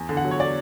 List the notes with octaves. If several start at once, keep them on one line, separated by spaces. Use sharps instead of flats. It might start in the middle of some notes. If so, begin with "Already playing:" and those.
Already playing: E2
D3
F#5
F#3
C#5
D5